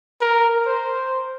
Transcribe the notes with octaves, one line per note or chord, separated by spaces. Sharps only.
A#4
C5